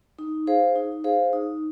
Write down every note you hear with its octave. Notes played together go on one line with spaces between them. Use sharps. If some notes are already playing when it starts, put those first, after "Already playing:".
D#4
G#4 C5 F5
D#4
G#4 C5 F5
D#4